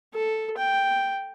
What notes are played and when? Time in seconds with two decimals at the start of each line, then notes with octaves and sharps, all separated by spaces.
0.15 A4
0.58 G5